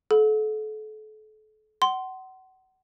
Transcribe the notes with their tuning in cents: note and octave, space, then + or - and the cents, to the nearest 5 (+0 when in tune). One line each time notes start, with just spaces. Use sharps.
A4 -35 F#5 -40
F#5 +30 C6 +0